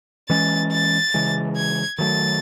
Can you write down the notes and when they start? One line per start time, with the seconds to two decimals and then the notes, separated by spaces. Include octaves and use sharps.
0.29 E3 G#3 C#4 A6
0.72 A6
1.14 C#3 E3 G#3
1.56 G#6
1.98 D#3 F#3 A3 A6